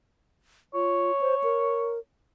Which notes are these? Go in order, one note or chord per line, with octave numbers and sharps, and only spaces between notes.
F4 C#5
C5
A#4